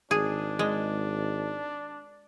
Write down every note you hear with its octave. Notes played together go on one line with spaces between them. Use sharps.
G#1 D4 G#4
G#3